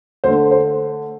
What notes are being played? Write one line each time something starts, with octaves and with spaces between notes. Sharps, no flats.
D3 A3 C5
C5